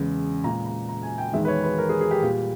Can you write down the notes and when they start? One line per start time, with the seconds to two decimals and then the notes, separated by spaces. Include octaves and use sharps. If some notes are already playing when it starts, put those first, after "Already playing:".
Already playing: E2 C#3 G#3
0.44 A#2 G#3 A#5
0.66 A#5
0.89 A#5
1.03 G#5
1.18 G5
1.33 E2 D#3 G#3 E5
1.45 B4
1.48 C#5
1.63 B4
1.78 A#4
1.89 G#4
2.01 G#4
2.11 G4
2.22 A#2 G3